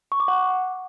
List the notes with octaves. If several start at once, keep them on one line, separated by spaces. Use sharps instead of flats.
C#6
D6
F#5